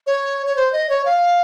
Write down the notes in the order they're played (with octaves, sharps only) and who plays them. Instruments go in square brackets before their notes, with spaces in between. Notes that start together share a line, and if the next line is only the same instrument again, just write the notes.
[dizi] C#5
C#5
C5
D#5
C#5
F5